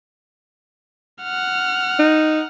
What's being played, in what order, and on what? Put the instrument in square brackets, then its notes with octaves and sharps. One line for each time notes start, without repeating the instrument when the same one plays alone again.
[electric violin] F#5 F6
[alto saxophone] D#4